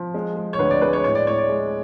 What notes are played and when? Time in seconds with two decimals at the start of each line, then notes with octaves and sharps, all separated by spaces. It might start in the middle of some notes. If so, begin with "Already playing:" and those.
Already playing: F3
0.14 G#3
0.37 G#3
0.53 C#5
0.59 D2 B4
0.70 D5
0.82 G#3 B4
0.93 C#5
1.04 A2 C#5
1.15 D5
1.26 A2 C#5
1.38 D5
1.49 G#3